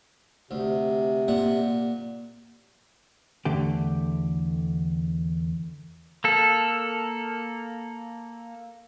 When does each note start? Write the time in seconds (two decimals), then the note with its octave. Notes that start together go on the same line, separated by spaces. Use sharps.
0.51 D2 C3
1.28 A#2 F#5
3.45 E2 D3 A3 G4
6.24 A#3 A4